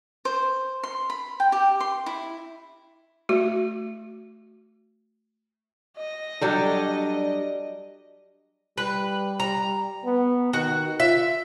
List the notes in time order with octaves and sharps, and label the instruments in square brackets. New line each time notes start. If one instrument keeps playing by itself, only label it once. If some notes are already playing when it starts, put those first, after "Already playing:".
[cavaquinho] C5
C6
B5
G5
G4
C6
E4
[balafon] A3 F#4
[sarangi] D#5
[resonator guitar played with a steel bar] F#3 G3 A4 [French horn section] D4 D5
[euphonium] G3 [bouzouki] B4
[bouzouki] A#5
[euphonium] B3
[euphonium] D#3 [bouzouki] F#4
[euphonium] F4 [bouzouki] E5